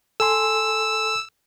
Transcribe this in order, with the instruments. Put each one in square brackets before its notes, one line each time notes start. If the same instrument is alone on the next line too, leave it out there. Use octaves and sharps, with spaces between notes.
[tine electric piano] A4 G#5 C6 [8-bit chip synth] E6